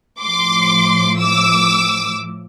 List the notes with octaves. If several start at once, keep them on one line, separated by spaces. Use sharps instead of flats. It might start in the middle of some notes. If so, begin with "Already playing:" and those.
A2 F3 C6 D6
D6 E6